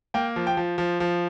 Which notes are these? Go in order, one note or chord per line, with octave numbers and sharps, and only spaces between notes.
A#3 G5
F3
G5
F3
F3
F3